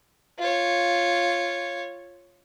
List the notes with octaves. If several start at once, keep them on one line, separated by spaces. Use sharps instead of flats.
F4 C#5